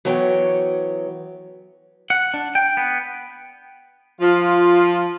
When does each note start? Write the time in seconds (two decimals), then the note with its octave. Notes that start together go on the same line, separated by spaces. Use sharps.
0.05 E3 F#3 B3 C#5 G5
2.10 F#5
2.34 D4
2.55 G5
2.77 B3
4.21 F3 F4